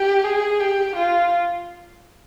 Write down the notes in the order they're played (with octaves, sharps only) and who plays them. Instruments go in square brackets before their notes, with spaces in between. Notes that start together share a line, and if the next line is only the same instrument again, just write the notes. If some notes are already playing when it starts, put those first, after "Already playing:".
Already playing: [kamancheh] G4
G#4
G4
F4